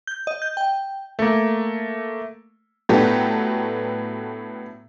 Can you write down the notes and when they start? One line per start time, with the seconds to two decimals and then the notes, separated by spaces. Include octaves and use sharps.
0.07 G6
0.27 D#5
0.42 G6
0.57 G5
1.19 A3 A#3
2.89 A2 F#3 B3 D4 G4 A4